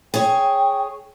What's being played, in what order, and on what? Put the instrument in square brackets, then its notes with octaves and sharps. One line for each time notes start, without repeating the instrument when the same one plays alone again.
[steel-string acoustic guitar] G#4 C#5 [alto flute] G5